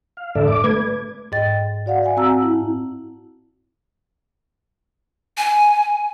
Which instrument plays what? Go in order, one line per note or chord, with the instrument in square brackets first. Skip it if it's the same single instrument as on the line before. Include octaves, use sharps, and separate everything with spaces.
[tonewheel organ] F5
G#2 D3 A4 D5 E5
D6
A3 B4 G#6
[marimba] G#2 D#5 G5 A6
F#4 D5 F5 F#5
E5 F#5 G#5
C4 F#4 A5 A#5 E6
E4
[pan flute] G#5